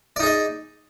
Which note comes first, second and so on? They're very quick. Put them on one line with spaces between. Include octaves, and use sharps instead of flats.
D5 D#4 G#4 D#5